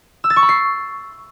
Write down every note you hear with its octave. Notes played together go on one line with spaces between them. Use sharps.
E6
A6
C#6
B5
C7